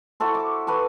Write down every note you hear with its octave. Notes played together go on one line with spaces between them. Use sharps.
E4 F#4 A4 C5
D6
F#4 A4 B4